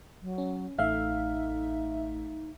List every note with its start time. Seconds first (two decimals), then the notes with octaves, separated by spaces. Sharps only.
0.22 F#3
0.38 C#4
0.78 A1 A3 D#4 E5 F5